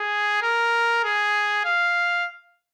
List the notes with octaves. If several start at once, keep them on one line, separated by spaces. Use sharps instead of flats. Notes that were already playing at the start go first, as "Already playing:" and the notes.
Already playing: G#4
A#4
G#4
F5